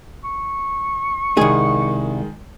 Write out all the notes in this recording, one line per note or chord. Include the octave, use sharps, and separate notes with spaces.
C#6
C2 D#3 G#3 G#4